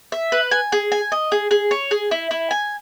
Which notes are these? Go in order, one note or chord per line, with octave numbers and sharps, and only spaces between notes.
E5
B4
G#5
G#4
G#5
D#5
G#4
G#4
C#5
G#4
E4
E4
G#5